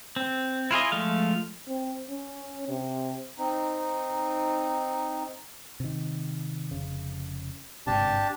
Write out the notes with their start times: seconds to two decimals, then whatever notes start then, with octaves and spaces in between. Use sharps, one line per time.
0.16 C4
0.71 E4 F4 G#4 D#5
0.92 F3 G#3 A3 F5
1.68 C4
2.10 C#4
2.69 C3
3.38 C4 D#4
5.80 C3 D#3
6.71 F1 C#3
7.87 G1 G#2 C3 D4 G4 A5